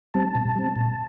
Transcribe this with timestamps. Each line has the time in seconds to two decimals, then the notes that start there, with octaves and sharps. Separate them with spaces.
0.14 G3 C4 A5
0.35 B2
0.56 G3 C4
0.76 A#2